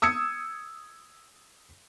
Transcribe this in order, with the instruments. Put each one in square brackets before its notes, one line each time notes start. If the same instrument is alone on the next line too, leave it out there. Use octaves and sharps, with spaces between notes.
[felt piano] D#6 E6 G#6 C#7